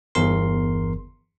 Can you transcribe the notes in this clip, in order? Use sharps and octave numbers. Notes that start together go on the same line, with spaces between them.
G1 E2 A#4 C6